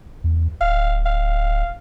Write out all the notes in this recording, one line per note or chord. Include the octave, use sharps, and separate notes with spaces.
E2
D1 F5
F5